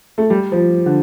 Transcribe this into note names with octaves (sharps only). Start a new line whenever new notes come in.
A3
G3
F3
D3